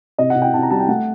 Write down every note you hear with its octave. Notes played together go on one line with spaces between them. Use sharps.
C3 D#5
F#5
C3
G5
C3 A5
A#5
G3 A5
G5
A3 F#5